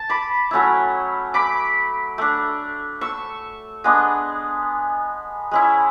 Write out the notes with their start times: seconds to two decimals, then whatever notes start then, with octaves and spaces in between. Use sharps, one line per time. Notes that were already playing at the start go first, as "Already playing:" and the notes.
Already playing: A5
0.10 B5 D6
0.51 F#3 A3 C#4 E4
1.34 B5 D6
2.18 A3 D4
3.01 C#6 E6
3.84 G#3 B3 D4
5.51 G#3 C#4 E4